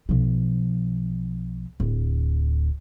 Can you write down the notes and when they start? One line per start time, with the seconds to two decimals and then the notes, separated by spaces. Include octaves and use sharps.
0.09 B1 F3
1.80 D1